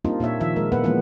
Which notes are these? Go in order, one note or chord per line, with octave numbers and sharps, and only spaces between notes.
G3 A#3 C4 D4 D#4 F4
A#2 A#3 C#5 E5
D#3 F3 E5
G#3 A#4
A#2 A#3 B3 B4 F#5
E3 F3 G#3 A#3 B3 C#4